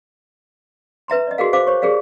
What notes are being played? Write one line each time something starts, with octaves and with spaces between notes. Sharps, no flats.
B4 E5 A#5 C6
D5 D#5
F#4 G#4 A#4 F5
C5 F5 D6
C5 C#5 C#6
G4 G#4 A#4 D5 F5